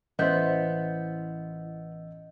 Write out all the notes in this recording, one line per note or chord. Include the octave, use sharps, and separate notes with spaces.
A1 B3 E4 B4 C5 D#5 E5 G6